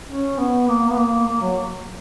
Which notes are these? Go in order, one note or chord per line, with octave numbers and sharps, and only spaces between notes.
C#4
B3
A#3
B3
A#3
A#3
F#3